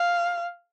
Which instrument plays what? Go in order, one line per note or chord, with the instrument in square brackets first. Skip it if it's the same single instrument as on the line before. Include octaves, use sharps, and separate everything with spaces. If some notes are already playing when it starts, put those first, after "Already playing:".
Already playing: [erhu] F5